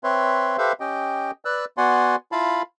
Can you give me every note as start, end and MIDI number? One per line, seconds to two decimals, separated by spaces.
0.04 0.57 60
0.04 0.57 71
0.04 0.57 73
0.04 0.57 76
0.04 0.57 84
0.58 0.72 67
0.58 0.72 69
0.58 0.72 71
0.58 0.72 72
0.58 0.72 76
0.58 0.72 77
0.80 1.31 61
0.80 1.31 67
0.80 1.31 75
0.80 1.31 79
1.45 1.65 71
1.45 1.65 74
1.45 1.65 88
1.45 1.65 90
1.77 2.16 59
1.77 2.16 66
1.77 2.16 74
1.77 2.16 78
1.77 2.16 80
1.77 2.16 84
2.32 2.62 64
2.32 2.62 65
2.32 2.62 77
2.32 2.62 81
2.32 2.62 83